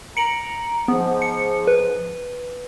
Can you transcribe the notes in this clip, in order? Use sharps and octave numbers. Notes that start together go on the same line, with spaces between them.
A#5 C#7 D7 F#7
G#2 F3 B3
C#7
B4